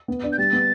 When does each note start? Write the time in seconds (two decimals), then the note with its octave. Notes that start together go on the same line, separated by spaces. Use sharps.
0.08 B3
0.23 D4
0.32 G6
0.38 G3 A6
0.53 B3